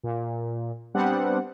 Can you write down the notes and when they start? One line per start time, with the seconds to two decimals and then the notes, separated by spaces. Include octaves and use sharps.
0.03 A#2
0.94 G3 B3 C4 D4 F#5